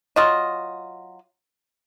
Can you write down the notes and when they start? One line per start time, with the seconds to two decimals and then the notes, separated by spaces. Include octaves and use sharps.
0.16 F#3 F4 D#5